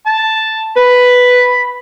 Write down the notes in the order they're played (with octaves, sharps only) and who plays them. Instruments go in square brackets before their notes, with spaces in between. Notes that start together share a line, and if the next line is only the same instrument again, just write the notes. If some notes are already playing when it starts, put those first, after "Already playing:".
[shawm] A5
[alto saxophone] B4 [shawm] B5